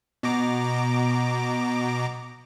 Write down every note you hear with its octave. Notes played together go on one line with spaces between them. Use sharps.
B2 A#5 D6